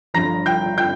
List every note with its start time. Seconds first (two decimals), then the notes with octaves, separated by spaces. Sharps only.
0.14 G1 G2 D3 F3 A#5 A#6
0.46 G5 G6
0.78 G5 G6